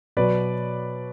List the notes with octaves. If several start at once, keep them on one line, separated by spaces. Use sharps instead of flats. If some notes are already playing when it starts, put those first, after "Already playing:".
B2 F#3 B4 D5